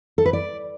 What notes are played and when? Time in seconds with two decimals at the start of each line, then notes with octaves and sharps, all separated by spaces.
0.18 A4
0.26 B4
0.33 D5